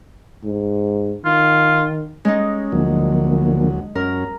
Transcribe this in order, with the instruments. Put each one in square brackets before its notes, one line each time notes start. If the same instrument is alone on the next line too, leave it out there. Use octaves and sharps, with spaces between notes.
[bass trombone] G#2
[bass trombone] D#3 [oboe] F4
[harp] G#3 D#4 [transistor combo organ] C#4
[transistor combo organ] D2 F#3 [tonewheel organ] D3 F3 A#3
[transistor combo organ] F#2 C#4 [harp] A#4